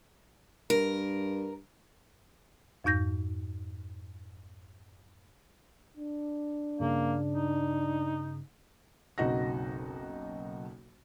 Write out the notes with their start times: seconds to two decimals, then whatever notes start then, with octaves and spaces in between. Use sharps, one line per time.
0.70 G2 A#4
2.84 F2 G#2 D#4 G6 A#6
5.97 D4
6.80 G2 C#3 A#3
7.34 D#4
9.18 F#1 B1 C4 D#4 F#4 A#6